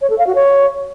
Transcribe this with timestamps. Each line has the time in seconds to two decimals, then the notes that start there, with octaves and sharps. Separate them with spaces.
0.01 C#5
0.10 A4
0.18 F5
0.27 F#4
0.35 C#5